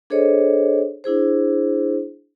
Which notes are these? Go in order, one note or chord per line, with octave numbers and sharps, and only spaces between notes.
D4 G#4 A4 C5 C#5 D#5
D4 E4 G#4 C5